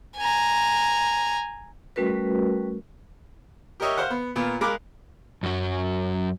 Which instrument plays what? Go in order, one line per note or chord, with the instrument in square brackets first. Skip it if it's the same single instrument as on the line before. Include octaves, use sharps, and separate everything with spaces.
[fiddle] G#5 A#5
[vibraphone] G3 A3 C#4 F#4 A#4 B4
[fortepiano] G4 A#4 C#5 D#5 E5
C5 F5 F#5
B3
A#2 B3 F4
G#3 A#4 F5 B5 D6 F#6
[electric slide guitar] F#2 F#3